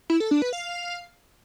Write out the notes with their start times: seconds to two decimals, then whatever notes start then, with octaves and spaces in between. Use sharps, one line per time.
0.10 E4
0.20 A4
0.31 D4
0.42 B4
0.53 F5